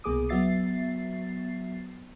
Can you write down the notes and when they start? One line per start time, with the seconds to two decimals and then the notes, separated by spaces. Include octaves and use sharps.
0.04 C2 B2 A#3 G#4 D6 D#6
0.29 F#3 B3 F#4 E5 A6 C7